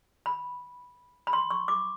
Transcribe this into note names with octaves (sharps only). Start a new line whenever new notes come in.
B5
B5
C6
C#6
D6